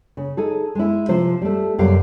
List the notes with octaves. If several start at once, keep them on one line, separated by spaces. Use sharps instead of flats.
C#3
D#4 G#4 A4
G#3 E4
C3 F3 C5
G3 A3
F#2 C3 G3 G4 A#4 F5